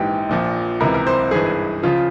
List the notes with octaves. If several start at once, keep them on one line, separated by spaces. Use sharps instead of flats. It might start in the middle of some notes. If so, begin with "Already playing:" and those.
Already playing: A#1 G#2 E3 G4
A#1 A#2 F3
C#2 C3 E3 A#4
A#4
C5
G#1 G2 E3 G#4
C#3 F3 F4